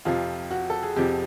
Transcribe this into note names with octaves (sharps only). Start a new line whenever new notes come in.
F2 C3 F3 F4
F#4
A4
G#4
F2 C3 F3 G4